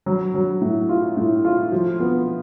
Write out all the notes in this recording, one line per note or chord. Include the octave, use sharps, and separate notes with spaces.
F#3
F#3
A2
F4
A2
F4
F3
B3